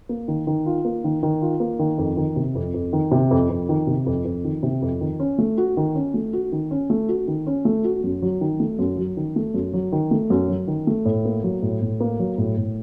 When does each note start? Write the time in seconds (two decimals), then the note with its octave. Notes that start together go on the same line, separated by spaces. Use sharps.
0.09 A#3
0.28 D#3
0.47 D#3
0.66 F4
0.85 A#3
1.04 D#3
1.23 D#3
1.41 F4
1.60 A#3
1.79 D#3
1.98 F2
2.17 D#3
2.36 C3
2.55 F2
2.74 F2
2.93 D#3
3.11 C3
3.31 F2
3.50 F2
3.69 D#3
3.87 C3
4.06 F2
4.25 F2
4.44 D#3
4.63 C3
4.82 F2
5.01 D#3
5.20 C#4
5.38 A3
5.58 F#4
5.77 D#3
5.95 C#4
6.14 A3
6.33 F#4
6.52 D#3
6.71 C#4
6.90 A3
7.09 F#4
7.28 D#3
7.47 C#4
7.65 A3
7.84 F#4
8.04 F#2
8.22 F#3
8.41 D#3
8.60 A3
8.79 F#2
8.98 F#3
9.17 D#3
9.36 A3
9.54 F#2
9.73 F#3
9.92 D#3
10.11 A3
10.30 F#2
10.49 F#3
10.68 D#3
10.87 A3
11.05 A2
11.25 A#3
11.43 F#3
11.62 A2
11.81 A2
12.00 A#3
12.19 F#3
12.38 A2
12.57 A2